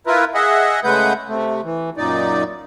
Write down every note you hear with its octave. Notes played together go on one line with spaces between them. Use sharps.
E4 F4 A#4 B4
G#4 D#5 E5 F#5
C#3 G#3 A3 B4 F#5 G6
C3 A3
E3
F#2 A#2 D#4 D5